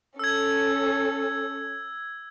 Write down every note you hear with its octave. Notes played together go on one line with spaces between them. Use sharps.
C#4 A4 E6 G#6